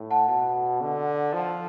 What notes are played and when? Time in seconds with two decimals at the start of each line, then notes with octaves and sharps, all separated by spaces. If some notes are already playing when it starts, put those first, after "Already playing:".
Already playing: A2
0.11 F#5 A5
0.28 B2 F#5 A5
0.81 D3
1.34 F3